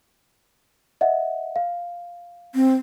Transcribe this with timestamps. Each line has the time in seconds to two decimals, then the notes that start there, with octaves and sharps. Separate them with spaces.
1.01 D#5 E5 F#5
1.56 F5
2.55 C4